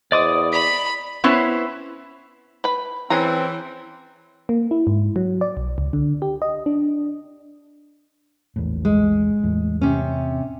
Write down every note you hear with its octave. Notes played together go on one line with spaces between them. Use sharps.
E2 C5 D5 D#5 D6 D#6
B5 B6
B3 C#4 E4 B4 C5
B4 B5
E3 C4 C#4 G#4 A#5
A#3
E4
G#2
F#3
D5
B1
C#2
D3
G4
D#5
D4
A#1 E2 A2
G#3
E2 A2
C3 C#4